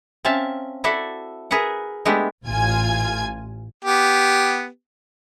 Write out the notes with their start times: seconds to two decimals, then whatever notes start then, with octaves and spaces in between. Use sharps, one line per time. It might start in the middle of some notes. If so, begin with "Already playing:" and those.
0.25 C4 C#4 E5 F5 A5
0.84 E4 F#4 A4 D5 E5
1.51 G#4 A#4 B4 E5 F#5
2.05 G#3 A3 B3 D4 E4 G4
2.46 A1 F4 G#5 G#6
3.85 B3 G4